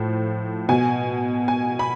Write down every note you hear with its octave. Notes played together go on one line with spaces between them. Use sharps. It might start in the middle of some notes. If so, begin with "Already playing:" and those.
Already playing: A2 F3
B2 G#5
G#5
B5